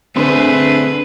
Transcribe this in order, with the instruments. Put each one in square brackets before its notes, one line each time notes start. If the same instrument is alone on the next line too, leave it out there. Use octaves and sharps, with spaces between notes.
[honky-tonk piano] D3 C6 [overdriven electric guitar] A3 G#4 [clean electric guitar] C4 [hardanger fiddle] B4